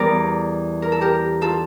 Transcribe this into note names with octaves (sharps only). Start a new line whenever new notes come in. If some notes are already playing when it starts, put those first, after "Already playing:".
Already playing: E2 E3 G3 A#4 D5
A#4
A4
G4 A#4
F4 A4